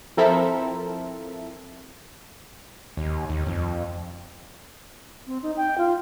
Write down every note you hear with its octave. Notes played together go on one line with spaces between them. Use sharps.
F3 C4 E4 A4 A#4 E5
D#2
D#2
F2
C4
D#4
G5
F4